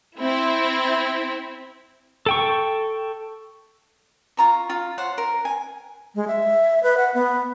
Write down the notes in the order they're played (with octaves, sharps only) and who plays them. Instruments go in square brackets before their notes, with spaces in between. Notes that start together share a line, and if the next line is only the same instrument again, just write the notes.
[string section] C4 E4
[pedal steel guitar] A4 G5 C#6
[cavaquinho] F4 A#5 C#6
F4
C5 C#5 F#5
A#4
G#5
[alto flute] G#3
E5
B4
F#5
B3